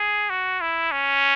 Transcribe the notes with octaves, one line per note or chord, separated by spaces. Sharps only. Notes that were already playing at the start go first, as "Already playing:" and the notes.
Already playing: G#4
F#4
E4
C#4